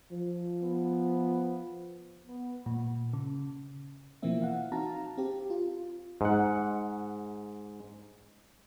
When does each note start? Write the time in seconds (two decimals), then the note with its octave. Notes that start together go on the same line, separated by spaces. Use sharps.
0.11 F3
0.63 B3
2.27 B3
2.66 A#2
3.13 C#3
4.22 B2 E3 F3 A#3 C4 E5
4.42 F5 F#5
4.72 C4 D#4 F#4 F5 A5 A#5
5.17 C4 G4
5.50 F4
6.21 G#2 F#5